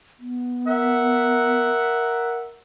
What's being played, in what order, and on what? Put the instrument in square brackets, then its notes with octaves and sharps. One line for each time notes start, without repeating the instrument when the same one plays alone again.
[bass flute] B3
[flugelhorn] A#4 [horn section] E5 F#5